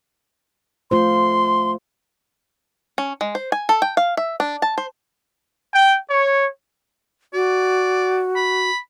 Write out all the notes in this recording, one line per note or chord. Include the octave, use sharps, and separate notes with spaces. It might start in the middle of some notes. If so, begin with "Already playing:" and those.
A3 F4 C5 C6
C#4
G#3
C5
G#5
A4
G5
F5
E5
D4
A5
C5
G5
C#5
F#4 D5
B5